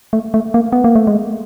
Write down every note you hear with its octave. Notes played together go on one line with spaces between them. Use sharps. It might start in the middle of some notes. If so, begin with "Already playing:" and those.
A3
A3
A#3
B3
A#3
A3
G#3